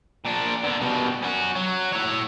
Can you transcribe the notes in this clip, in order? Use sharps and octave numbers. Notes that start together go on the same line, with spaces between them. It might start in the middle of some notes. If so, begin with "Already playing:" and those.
A#2 D4
D3 B3
B2 G3
C#4 F#4
F#3
E4 C#5